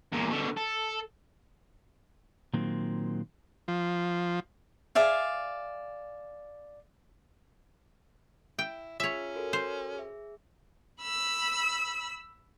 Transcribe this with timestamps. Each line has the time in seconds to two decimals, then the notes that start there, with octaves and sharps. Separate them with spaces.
0.12 E2 A#2
0.30 B2 D3
0.57 A4
2.54 A#2 D#3 F#3 A#3 C4
3.68 F3
4.95 G#4 D5 E5 F5
8.59 E4 G5
9.00 C#4 F4 G#4 C#5 E5
9.36 F#4 A4 A#4
9.53 C5
9.95 G#4 E5
11.01 B5 E6